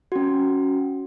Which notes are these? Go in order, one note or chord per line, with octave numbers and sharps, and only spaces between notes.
C#4 F#4